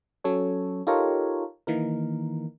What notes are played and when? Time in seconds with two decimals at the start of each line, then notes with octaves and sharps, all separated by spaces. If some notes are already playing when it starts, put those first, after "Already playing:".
0.24 F#3 C#4 A4 C#5
0.87 D#4 F4 G4 A4 A#4 C#5
1.67 D#3 E3 A#3 D#4 A#4